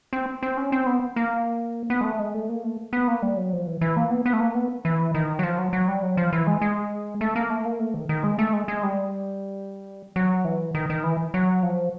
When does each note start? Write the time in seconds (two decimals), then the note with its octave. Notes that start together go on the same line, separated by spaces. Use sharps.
0.13 C4
0.43 C4
0.57 C#4
0.72 C4
0.86 B3
1.16 A#3
1.90 B3
2.01 G#3
2.04 A3
2.19 G#3
2.34 A3
2.49 A#3
2.64 A3
2.93 B3
3.08 A#3
3.22 G3
3.37 F#3
3.53 F3
3.67 E3
3.81 E3
3.97 A#3
4.11 B3
4.26 B3
4.33 A3
4.40 A#3
4.55 B3
4.85 E3
5.15 D#3
5.39 F#3
5.43 F3
5.59 F#3
5.73 F#3
5.88 G3
6.03 F#3
6.17 F3
6.33 E3
6.47 G#3
6.61 G#3
7.21 A3
7.36 A#3
7.50 A3
7.65 A#3
7.79 A3
7.94 D#3
8.09 D#3
8.24 G#3
8.39 A3
8.53 G#3
8.68 G#3
8.83 G3
10.16 F#3
10.45 E3
10.75 D#3
10.90 D#3
11.04 E3
11.34 F#3
11.63 F3